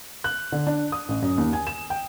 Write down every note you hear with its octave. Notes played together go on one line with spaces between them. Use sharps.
F#6
D3
D4
D#6
A1
F#2
D#2
G#5
E7
G5